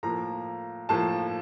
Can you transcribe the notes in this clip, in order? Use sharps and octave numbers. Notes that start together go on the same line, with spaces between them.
A2 F3 A#3 A#5
A2 F3 A#3 A5